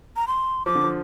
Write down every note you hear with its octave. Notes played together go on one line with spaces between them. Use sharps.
A#5
C6
F3 D6
D3
F3